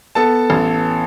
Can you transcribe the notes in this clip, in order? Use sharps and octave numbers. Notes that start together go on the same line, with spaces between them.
B3 A4 A5
A1